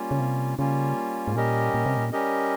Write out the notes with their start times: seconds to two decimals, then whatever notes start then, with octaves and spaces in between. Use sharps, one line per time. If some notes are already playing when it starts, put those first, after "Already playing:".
Already playing: G3 A#3 C#4 F4
0.11 C#3
0.20 C3
0.59 C#3 G3 A#3 C#4 F4
1.27 G#2
1.35 A#2 G3 C#4 G4 A#4 D#5
1.74 A#2
1.86 C3
1.97 A#2
2.12 G3 C#4 G4 A#4 D#5